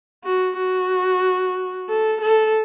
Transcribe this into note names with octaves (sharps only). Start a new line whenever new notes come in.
F#4
F#4
A4
A4